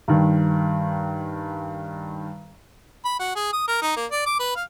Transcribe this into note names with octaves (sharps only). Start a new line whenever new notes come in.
G2 D#3
B5
F#4
G#4
D#6
A#4
D#4
A#3
D5
D6
B4
F5